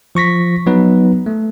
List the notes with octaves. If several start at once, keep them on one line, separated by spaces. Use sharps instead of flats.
F3 C#6 A#6 B6
F#3 B3 D#4 B4
A3